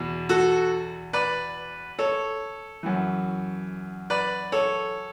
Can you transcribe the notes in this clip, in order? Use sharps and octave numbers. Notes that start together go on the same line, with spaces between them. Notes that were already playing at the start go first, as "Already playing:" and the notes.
Already playing: E2 B2
F#4 A4
B4 D5
A4 C#5
F#2 E3
B4 D5
A4 C#5